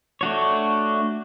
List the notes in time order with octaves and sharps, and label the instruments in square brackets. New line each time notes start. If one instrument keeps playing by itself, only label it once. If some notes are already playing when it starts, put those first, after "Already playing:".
[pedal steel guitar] A3 D4 F#4 C#5